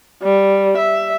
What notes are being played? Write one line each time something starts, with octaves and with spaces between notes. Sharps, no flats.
G3
E5